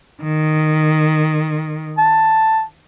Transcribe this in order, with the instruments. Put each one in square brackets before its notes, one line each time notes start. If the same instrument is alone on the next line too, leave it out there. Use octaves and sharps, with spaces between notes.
[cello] D#3
[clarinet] A5